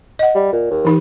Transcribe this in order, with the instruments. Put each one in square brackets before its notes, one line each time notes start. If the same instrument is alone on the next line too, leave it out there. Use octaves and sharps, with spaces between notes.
[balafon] D#5 F#5
[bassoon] G3
A#2
D#2
[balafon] E3 D#4 G4